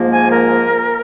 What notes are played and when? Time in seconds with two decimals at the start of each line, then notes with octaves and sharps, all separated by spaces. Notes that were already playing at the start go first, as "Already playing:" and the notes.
Already playing: G#2 F3 A#3
0.12 G#5
0.31 A#4